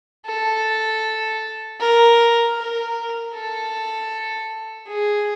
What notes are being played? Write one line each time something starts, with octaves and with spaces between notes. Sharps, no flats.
A4
A#4
A#4
A4
G#4